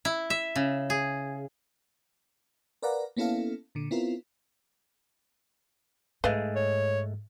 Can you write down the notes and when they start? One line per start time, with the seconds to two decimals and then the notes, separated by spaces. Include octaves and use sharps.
0.05 E4
0.30 E5
0.56 C#3
0.90 G#4
2.82 A#4 B4 D5 F5 F#5 A#5
3.17 A#3 B3 C#4 E4 A4 F5
3.75 A#2 D3
3.91 B3 C4 E4 F4 A#4
6.24 G#2 G#3 A3 G#4 B4 D#5 F5
6.56 C#5